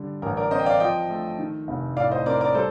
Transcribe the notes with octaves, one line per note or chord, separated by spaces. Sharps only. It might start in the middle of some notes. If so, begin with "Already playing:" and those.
Already playing: D3 G3
A1 A#4
A#4 D5
C4 C5 D#5
G5
D5 F5
F3 D#5 G5
A3
D#3
F1
A2 D5 F5
C5 D#5
C4 A#4 D5
A#4 D5
G3 A4 C5